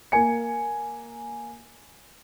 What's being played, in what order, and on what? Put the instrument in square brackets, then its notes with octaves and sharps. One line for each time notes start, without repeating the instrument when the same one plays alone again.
[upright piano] A#3 G#5 C#7